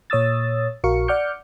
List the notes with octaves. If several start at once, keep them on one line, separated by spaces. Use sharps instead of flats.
A#2 C#5 D#6 E6 A6
A#1 F#4 A#4 F5 C#6 C#7
D5 F#5 D6 F6 G6 C#7